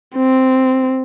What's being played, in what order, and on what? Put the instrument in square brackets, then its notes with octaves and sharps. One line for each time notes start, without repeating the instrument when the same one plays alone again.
[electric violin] C4